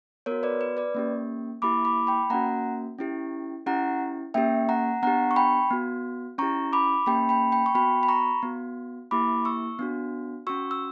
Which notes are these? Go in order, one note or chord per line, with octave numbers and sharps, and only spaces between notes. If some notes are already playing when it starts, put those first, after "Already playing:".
B3 A#4 C#5
F#4
B4 D5
B4
B4 D5
A#3 C#4 G4
A#3 E4 G4 B5 D6
B5 D6
G5 B5
A#3 C#4 F#4 F#5 A#5
C#4 E4 G4
C#4 E4 G4 F#5 A#5
A#3 C#4 G4 E5 G5
F#5 A#5
B3 D4 G4 F#5 A#5
C#6
G5 B5
B3 F#4
C#4 E4 G4 A#5 C#6
B5 D6
A#3 C#4 G4 G5 B5
G5 B5
G5 B5
C#6
B3 F#4 G5 B5
B5
A#5 C#6
B3 F#4
A#3 E4 G4 B5 D6
C#6 E6
B3 D4 F#4
C#4 F#4 C#6 E6
E6